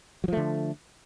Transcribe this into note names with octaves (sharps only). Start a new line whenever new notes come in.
D3 F3 F#3 A3